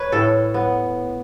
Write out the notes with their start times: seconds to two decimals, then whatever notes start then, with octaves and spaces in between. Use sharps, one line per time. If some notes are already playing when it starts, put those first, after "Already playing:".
Already playing: B4 C#5
0.12 A2 A4
0.54 B3